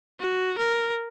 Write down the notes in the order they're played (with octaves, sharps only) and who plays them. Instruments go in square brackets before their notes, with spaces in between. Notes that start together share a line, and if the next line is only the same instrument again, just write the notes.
[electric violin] F#4
A#4